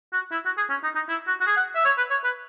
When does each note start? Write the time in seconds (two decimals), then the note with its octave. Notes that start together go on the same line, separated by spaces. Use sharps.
0.13 F#4
0.32 E4
0.45 F#4
0.57 G#4
0.70 C#4
0.83 D#4
0.95 D#4
1.09 E4
1.27 F#4
1.40 F#4
1.47 G#4
1.57 F#5
1.75 E5
1.85 C#5
1.98 B4
2.10 C#5
2.24 B4